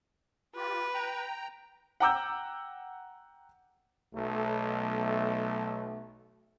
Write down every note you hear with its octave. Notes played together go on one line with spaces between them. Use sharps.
F4 G4 B4
G5 A#5
F#5 G5 A#5 D6 E6 G6
B1 A3